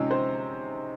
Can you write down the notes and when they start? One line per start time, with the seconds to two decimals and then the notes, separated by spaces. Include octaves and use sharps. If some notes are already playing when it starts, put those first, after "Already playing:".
Already playing: C3 F3 G#3 C4 C#4 D#4
0.11 C5